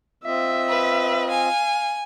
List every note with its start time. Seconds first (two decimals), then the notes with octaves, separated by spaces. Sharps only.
0.25 C4 F4 D#5 E5
0.69 B4
1.31 F5 G#5